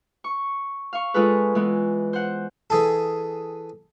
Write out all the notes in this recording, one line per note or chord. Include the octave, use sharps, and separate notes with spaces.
C#6
F5 C#6
G#3 F4 G#4 A4 B4
E3 G#3 B3
C5 F#5
E3 G#4 A4